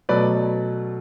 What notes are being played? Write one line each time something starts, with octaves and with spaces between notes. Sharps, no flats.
B2 F#3 A3 B4 D5